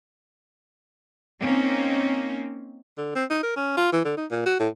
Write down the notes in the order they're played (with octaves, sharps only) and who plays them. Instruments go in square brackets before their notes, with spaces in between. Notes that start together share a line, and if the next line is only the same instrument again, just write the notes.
[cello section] A#3 C4 C#4 D#4
[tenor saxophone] D3
C4
D#4
A#4
C#4
F4
E3
D3
D#4
A#2
F#4
A2